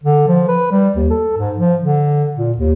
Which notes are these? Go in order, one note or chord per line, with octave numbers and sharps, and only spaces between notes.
D3
F3
B4
G3
D#2
A4
G#2
F3
D3
A#2
D#2